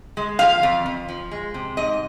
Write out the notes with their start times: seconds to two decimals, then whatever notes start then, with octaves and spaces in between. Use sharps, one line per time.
0.17 G#3
0.39 F3 F5
0.63 F2
0.86 F2
1.09 F3
1.31 G#3
1.54 C3
1.77 G#2 D#5